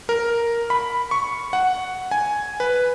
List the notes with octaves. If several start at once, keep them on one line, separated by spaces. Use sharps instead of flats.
A#4
B5
C#6
F#5
G#5
B4